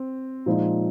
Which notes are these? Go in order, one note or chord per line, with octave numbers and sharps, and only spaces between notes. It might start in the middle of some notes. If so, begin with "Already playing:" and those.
Already playing: C4
A#2 F3 G#3 D#4